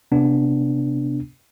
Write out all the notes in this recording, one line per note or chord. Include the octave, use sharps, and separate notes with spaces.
C3 B3 D4